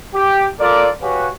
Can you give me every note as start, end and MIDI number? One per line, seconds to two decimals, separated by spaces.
0.14 0.45 67
0.60 0.88 65
0.60 0.88 69
0.60 0.88 70
0.60 0.88 74
1.01 1.28 66
1.01 1.28 67
1.01 1.28 71
1.01 1.28 73
1.01 1.28 77
1.01 1.28 80